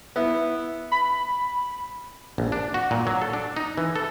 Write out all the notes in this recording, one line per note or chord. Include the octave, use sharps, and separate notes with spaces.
B3 E4
B5
A#1
D4
F#4
A#2
F#3
A4
D4
D#4
E3
A4